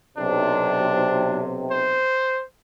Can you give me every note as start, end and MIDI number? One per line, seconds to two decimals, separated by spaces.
0.17 2.04 35
0.17 2.04 48
0.17 1.43 62
1.71 2.43 72